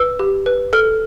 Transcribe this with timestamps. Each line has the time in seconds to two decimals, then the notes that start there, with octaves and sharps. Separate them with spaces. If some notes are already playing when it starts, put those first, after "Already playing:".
Already playing: B4 E6
0.19 G4
0.46 B4
0.73 A4 F6